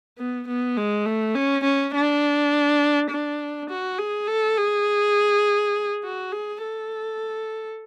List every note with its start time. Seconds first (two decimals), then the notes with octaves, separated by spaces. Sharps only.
0.18 B3
0.48 B3
0.77 G#3
1.06 A3
1.35 C#4
1.64 C#4
1.94 D4
3.11 D4
3.69 F#4
3.98 G#4
4.27 A4
4.57 G#4
6.04 F#4
6.32 G#4
6.62 A4